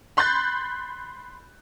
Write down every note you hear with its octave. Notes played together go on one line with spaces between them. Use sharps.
B5 C6 F#6 G6 A6